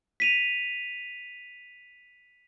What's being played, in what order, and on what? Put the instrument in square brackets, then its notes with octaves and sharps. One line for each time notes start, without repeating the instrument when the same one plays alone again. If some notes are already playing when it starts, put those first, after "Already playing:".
[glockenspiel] B6 D#7 F7